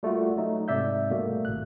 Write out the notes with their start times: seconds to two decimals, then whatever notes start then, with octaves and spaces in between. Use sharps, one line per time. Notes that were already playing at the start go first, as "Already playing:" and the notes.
0.03 G3 A3 A#3 F4 F#4
0.37 F#3 A3 D#4
0.68 G#2 C3 D5 E5 G6
1.10 B2 G3 A3 A#3
1.45 G#1 A2 F#6